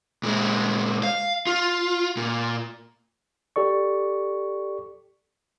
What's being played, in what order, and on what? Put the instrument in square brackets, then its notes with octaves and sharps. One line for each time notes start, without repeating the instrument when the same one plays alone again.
[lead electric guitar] A#2 G#3
F5
F4
A#2
[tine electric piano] G4 A4 D5 C#6